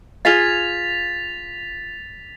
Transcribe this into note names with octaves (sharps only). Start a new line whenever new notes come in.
F4 G#4 F5 A6 B6 F7